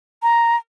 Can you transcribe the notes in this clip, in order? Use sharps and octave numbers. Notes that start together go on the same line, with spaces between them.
A#5